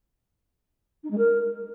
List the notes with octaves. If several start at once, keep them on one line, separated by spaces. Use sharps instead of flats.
D#4
G#3
A#4